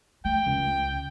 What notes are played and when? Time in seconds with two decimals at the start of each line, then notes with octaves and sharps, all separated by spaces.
0.25 A3 G5
0.46 C#2